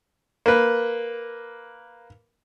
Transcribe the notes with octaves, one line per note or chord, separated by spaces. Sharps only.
A#3 B4